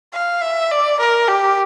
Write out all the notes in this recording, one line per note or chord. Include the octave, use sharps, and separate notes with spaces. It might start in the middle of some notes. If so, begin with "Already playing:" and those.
F5
E5
D5
A#4
G4